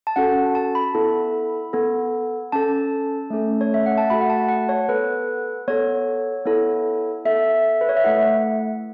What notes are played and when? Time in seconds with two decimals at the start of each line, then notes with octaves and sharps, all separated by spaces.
0.07 A5
0.16 C#4 F#4 A4 F#5
0.55 A5
0.75 B5
0.95 B3 E4 A4
1.73 B3 A4
2.52 C#4 A4 A5
3.30 A3 C#4 A4
3.61 C#5
3.74 E5
3.86 F#5
3.98 A5
4.10 A3 F#4 A4 B5
4.21 F#5
4.30 A5
4.49 F#5
4.69 C#5
4.89 B3 A4 B4
5.68 B3 A4 C#5
6.46 B3 E4 A4
7.25 B3 A4 E5
7.81 B4
7.89 C#5
7.97 E5
8.04 A3 E4 A4 F#5